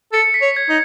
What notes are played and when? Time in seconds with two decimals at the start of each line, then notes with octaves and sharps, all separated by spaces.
0.13 A4 C#7
0.34 B6
0.42 C#5
0.56 G#6
0.69 D#4